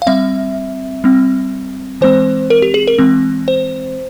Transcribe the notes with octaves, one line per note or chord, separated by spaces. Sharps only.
F5
G3 C4 E5
G3 C4
E3 G#3 C4 C5
A#4
G4
G#4
A#4
E3 G#3 C4
C5